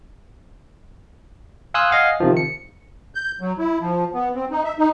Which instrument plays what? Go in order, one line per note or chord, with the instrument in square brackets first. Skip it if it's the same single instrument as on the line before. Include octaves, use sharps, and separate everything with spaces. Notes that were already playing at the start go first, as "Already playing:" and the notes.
[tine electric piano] F5 G#5 C6 D#6 E6 F#6
D#5 F5 F#5 G#5
C3 D#3 F3
C#7
[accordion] G6
F#3
E4
F3
B3
C4
D#4
E5
D#4